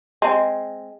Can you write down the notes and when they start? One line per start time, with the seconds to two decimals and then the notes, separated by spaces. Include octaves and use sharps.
0.22 G#3 C4